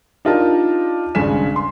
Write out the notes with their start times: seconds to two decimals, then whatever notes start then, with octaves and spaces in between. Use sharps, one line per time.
0.25 D4 D#4 F4 G4 A#4 A5
1.15 G#1 G2 C#3 G#5 B6 E7
1.56 C6